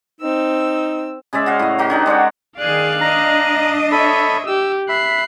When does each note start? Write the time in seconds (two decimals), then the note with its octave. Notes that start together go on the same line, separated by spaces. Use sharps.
0.21 C4 D#4 E6
1.33 C#3 G#3 D5 E5
1.46 F#4 D#5 F5
1.59 A2 D#5
1.78 F#4 G4 A#4
1.90 D#3 D4 D#4
2.06 G#3 D4 C#5 F#5
2.58 D#3 G#4 D5 F5 F#6
3.01 D4 D#5 A#5
3.92 A4 C#5 E5 B5
4.47 G4 E6
4.89 E5 B5 F#6 C7